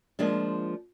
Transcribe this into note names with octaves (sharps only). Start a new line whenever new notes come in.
F3 G#3 A#3 D4